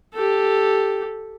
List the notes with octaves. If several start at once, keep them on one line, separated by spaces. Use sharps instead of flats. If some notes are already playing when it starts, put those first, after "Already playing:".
G4 A4